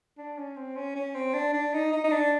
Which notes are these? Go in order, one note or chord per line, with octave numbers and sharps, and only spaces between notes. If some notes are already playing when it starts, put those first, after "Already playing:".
D4
C#4
C4
C#4
C#4
C4
D4
D4
D#4
D#4
D#4
D4